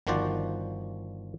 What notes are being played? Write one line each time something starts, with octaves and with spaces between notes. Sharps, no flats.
G1 D#3 F3 F#4 C5 D5